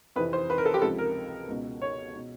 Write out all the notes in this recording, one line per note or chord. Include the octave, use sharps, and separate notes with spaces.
F2 C3 E3 B4
C5
B4
A#4
A4
G4
C#2 C3 F3 A4
A#4
C#2 B2
C#5
B2